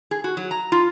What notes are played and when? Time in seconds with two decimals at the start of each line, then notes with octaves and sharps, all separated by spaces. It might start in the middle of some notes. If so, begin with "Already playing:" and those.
0.11 G#4
0.24 F#4
0.37 F#3
0.51 A#5
0.72 F4